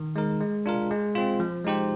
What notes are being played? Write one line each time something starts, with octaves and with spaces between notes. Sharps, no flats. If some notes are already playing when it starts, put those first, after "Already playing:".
Already playing: D#3
G#3 D#4 A#4
G#3
D4 F4 A#4
G#3
C4 F4
F3
G#3 D#4 G4 C5